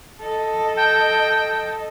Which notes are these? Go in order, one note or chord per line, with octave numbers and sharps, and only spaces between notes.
A4 D#5
G5